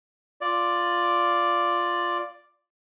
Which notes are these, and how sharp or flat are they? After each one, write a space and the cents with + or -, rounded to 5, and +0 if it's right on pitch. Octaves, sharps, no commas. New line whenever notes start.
F4 +0 D5 +0